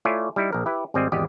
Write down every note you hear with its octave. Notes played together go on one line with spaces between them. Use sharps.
A3 E4 F4 C#5 D5 G#5
G3 D#4 E4
A#1 A#4
E4 G4 B4
G#1 G3 C4 D5 D#5 G#5
G#1 E2 G4 D5 D#5